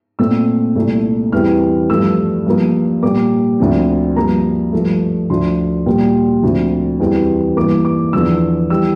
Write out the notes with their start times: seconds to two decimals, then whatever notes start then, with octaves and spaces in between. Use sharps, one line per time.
0.19 A#2 A3 C4 E6
0.75 C2 A#2 A3
1.32 E2 E3 G3 C4 F6
1.90 G2 F3 A3 E6
2.46 G2 F3 A#3
3.03 A#2 G3 A#3 D6
3.60 D2 D3 F3 C4
4.16 G2 F3 A#3 A#5
4.73 G2 F3 A3
5.30 D2 D3 F3 C6
5.86 A#2 G3 A#3
6.43 D2 D3 F3 C4
7.00 E2 E3 G3 C4
7.57 G2 E3 A#3 D6
7.85 D6
8.13 E2 D3 F3 E6
8.70 E3 G3 E6